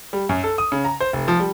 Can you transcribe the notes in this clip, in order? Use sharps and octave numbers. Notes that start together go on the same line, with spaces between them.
G3
F#2
A4
D#6
C#3
A#5
C5
F1
F3
G3